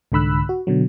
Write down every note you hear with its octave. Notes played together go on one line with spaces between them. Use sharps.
C2 G#2 D3 B5 E6 F#6
F#4
B2 D3 F#3